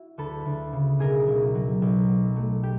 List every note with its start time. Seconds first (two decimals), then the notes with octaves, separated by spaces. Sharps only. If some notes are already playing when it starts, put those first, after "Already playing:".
Already playing: E4 F#4
0.18 D2 A4 B4
0.45 D2
0.73 C#3
0.99 B1 G#4 A#4
1.27 B1
1.55 F#3
1.82 B1
2.09 F#3
2.36 A3
2.63 G4